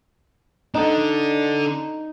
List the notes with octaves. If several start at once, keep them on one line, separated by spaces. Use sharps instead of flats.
D4 D#4 A4